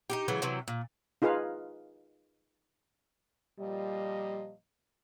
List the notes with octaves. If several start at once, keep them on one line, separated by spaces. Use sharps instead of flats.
D#4 F#4 G4
C#3 E3 F#3 A3
C3 E3 F#3
A#2
D#4 F4 G#4 B4 F5
A#2 F3 G3 D#5